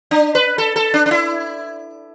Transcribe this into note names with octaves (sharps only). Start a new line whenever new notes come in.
D4
B4
A4
A4
D4
D4
E4